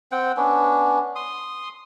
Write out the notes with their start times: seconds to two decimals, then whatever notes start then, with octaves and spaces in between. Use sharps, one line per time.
0.12 C4 F#5 G5
0.37 B3 C#4 D4
1.16 C6 D#6